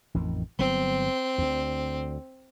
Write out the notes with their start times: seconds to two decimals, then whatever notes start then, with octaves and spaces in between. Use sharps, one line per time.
0.15 A1 F2 D#3
0.59 G1 F#3 B3 C4
1.38 D2 D3